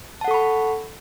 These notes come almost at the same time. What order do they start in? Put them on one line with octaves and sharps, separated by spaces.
A5 F#5 A4 C#6 B5